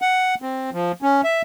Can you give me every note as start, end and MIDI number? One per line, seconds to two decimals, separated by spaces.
0.02 0.35 78
0.42 0.70 60
0.73 0.92 53
1.02 1.21 61
1.24 1.42 76